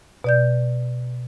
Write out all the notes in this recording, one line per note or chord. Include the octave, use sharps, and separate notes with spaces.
B2 D5 G6